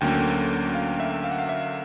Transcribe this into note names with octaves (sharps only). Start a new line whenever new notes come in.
D2 D3 F#3 A#3 C#4 G5
F5
E5
F5
F#5
F5
E5